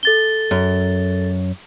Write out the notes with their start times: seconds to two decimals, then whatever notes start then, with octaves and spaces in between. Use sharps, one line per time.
0.03 A4 A6 G7
0.51 F#2